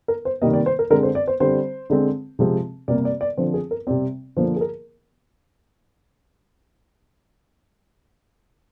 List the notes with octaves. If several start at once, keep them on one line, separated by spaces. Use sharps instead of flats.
A#4
C5
C3 D#3 G3 A#3 D#5
D5
C5
A#4
D3 G#3 C4 A#4
C5
D5
C5
D3 G3 C4 C5
D3 G#3 C4
C3 F3 G#3 C4
C3 G3 A#3 D5
D5
D5
D3 F3 C4 C5
G#4
A#4
C3 G3 C4 D5
D3 F3 A#3 C5
G#4
A#4